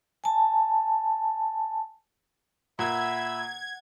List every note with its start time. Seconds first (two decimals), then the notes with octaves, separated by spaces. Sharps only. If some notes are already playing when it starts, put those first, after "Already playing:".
0.24 G#5 A5
2.79 A#2 E5 F#5 B5 E6 G#6